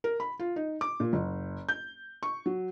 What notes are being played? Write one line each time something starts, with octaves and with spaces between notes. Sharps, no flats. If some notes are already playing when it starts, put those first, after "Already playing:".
A#4
B5
F4
D#4
D6
A#2
F#1
G6
C#6
F#3